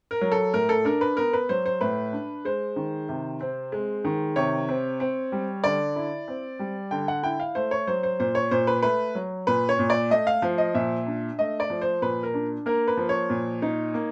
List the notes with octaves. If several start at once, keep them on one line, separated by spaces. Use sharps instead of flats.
A#4
F#3
A4
A2 A#4
A4
D4 A#4
B4
B3 A#4
B4
F#3 C5
C5
A2 B4
D4
G#3 C5
D#3
C3
C4
G#3
D#3
C3 C#5
C4
C4
G3
D3 D5
E4
C4
G3
D3 G5
F#5
E4 G5
F5
A3 C5
C#5
F#3 C5
C5
A#2 C5
C#5
A#2 C5
B4
A3 B4
F#3
A#2 B4
C#5
A#2
D5
A3 D#5
F5
F3
D#5
A#2 E5
D4
A3 D#5
D5
F3
C5
A#2 B4
A#4
D4
A#3 A#4
B4
F3
C#5
A#2
D#4
A#3